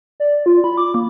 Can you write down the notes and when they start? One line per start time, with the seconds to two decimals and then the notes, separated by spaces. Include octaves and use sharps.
0.20 D5
0.46 F4
0.64 B5
0.78 D6
0.94 A#3